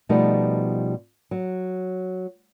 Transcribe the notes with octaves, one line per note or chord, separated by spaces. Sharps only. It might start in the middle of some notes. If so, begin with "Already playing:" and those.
B2 F3 G3 A3 B3 D#4
F#3